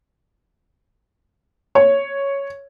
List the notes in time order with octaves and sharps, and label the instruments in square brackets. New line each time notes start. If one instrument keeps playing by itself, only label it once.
[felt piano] C#5